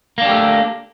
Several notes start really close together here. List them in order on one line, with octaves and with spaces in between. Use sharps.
A#3 D4 G4 A3